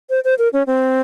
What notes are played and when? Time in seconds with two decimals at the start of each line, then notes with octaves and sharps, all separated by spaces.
0.10 C5
0.24 C5
0.38 A#4
0.53 C#4
0.67 C4